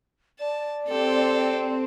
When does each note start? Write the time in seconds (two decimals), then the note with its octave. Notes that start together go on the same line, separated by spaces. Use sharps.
0.40 D5 A5
0.88 C4 G4 A4